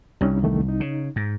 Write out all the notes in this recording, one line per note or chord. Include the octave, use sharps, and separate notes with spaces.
C2 G3 C#4 D#4
E2 D#3 A3
D#4
C#3
G#2